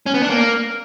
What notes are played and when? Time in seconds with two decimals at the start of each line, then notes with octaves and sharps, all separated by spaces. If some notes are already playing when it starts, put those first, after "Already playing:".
0.06 C#4
0.14 B3
0.22 D4
0.30 A#3